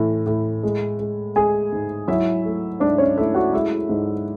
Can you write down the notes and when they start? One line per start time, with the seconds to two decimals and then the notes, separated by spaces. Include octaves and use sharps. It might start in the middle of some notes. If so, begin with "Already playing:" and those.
Already playing: A2 E3
0.26 A2
0.63 G#3
1.00 G#3
1.36 G#3 G#4 G#5
1.72 G#2
2.08 F#3 E4 E5
2.45 A3
2.80 G#2 D4 D5
2.98 C#4 C#5
3.17 A3 E4 E5
3.35 F#4 F#5
3.53 G#3 E4 E5
3.89 G#2